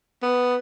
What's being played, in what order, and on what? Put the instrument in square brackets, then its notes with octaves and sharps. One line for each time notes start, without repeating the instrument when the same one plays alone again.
[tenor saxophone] B3